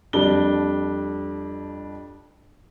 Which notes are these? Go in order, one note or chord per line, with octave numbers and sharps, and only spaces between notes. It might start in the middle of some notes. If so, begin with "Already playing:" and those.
F2 G3 D4 G7